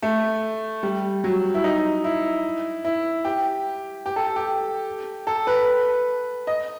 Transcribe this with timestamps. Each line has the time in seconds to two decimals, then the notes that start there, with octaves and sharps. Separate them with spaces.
0.02 A3
0.83 G3
1.24 F#3
1.54 E4
1.64 D#4
2.04 E4
2.85 E4
3.25 G4
4.06 G4
4.16 A4
4.36 G4
5.27 A4
5.47 B4
6.47 D#5